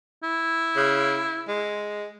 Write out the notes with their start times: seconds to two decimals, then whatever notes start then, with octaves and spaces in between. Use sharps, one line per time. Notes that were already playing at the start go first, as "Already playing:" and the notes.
0.23 E4
0.77 C#3
1.48 G#3